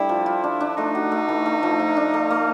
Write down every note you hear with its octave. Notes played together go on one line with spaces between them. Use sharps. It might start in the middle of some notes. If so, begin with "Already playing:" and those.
Already playing: G3 A3 D4 E4
F3
F4
D4
D4
A3 D#4
F#4
A3
E3
A3
F3
F3
D4
A3
A3